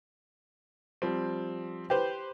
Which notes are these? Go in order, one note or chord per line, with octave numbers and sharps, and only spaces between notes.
F3 G3 C4
G4 B4 C5